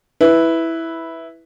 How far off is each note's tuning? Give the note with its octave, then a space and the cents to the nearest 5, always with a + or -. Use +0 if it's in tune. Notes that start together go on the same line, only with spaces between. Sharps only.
E4 -5 B4 +0